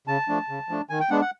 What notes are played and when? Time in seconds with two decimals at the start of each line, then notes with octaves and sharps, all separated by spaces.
0.07 C#3 A5
0.29 F3 A3 D4
0.49 C#3
0.69 F3 A3 D4
0.90 D#3 G#5
1.00 G5
1.10 G#3 B3 D4 F#5
1.21 F#5